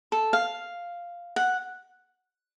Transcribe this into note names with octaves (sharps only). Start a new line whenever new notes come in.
A4
F5
F#5